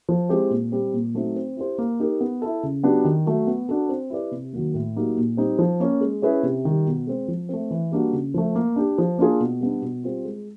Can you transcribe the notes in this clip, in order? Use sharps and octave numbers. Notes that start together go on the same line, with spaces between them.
F3
G#3 C4 E4 G4
A#2
G3 C4
A#2
F#3 A3 C4 D#4
C4
E4 G4 C5
A#3
D#4 G4 A#4
B3
E4 A4
C#3
F#3 B3 D4 G4
D#3
F#3 A3
B3
D4 F#4 A4
C4
E4 G4 B4 D5
C3
D#3 F#3 A#3
A2
F#3 A#3 D#4 G4
A#2
G3 C4 D#4
F3
A#3 C#4
G#3
C#4 E4 G#4 B4
C3
D#3 G3
B2
G#3 C4
F3
A3 C4
E3
G3 A#3 D4 F#4
C#3
F3 A3
A#3
D4 G4
F3
A#3 D4 F4 G#4
B2
G3 B3 D4
B2
G3 C4 F4
G#3